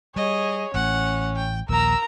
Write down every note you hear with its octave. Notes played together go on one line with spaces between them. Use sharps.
G3 G#4 C#5 D#5
A1 A2 C#4 F#5
G5
A#1 D#2 A#2 A#4 A#5 E6